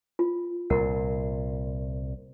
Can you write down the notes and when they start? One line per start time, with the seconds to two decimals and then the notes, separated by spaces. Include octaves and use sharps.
0.19 F4
0.70 C2 A#2 A#4 F#5